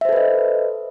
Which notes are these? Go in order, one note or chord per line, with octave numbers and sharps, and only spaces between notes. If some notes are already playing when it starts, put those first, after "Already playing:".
A4 B4 C5 D#5 E5